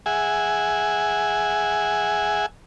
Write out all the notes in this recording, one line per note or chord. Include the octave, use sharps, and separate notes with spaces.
G#4 E5 F#5 G#5